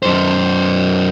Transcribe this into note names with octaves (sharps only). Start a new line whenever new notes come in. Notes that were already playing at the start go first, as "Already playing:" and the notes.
F#2 C5